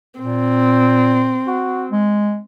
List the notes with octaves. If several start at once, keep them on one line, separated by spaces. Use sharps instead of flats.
A#2 C4
F#4
G#3